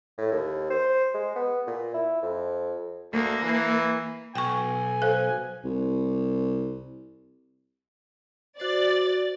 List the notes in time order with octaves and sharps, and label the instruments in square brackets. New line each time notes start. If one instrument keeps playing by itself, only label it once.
[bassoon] A2
D#2
C5
G#3
B3
A#2
E4
F2
[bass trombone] D2 [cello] A#3
[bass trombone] E3
[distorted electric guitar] B1 [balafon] G5 C#6 [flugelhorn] G#5
[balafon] A4 [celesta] C5 F5 F#6
[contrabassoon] C2
[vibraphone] F#4 C5 [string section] D5 A6